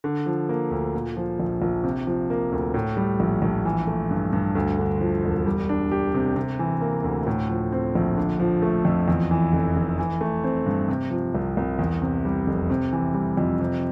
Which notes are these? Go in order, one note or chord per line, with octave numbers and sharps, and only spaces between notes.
D3
F3
A#3
D2
A#2
F3
A#1
A#1
C3
F3
A#3
D2
A2
G3
A#1
A#1
E3
A3
G2
G2
D2
D3
F3
E1
G3
D4
G4
C3
C3
E3
A#3
D2
A2
F3
C4
A#1
D3
F3
A3
F2
E2
E3
F1
F1
E3
A3
C4
G2
C3
F3
C2
C2
E2
C3
G3
F1
C3
E3
G3
F2
C3